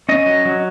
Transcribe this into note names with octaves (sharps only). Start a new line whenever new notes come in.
C#4 D#5
F#3
F#3